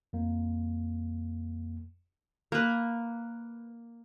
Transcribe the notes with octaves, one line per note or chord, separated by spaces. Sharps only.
F2 A#3
A#3 B4